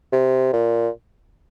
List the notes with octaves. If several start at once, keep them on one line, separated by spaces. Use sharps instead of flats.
C3
A#2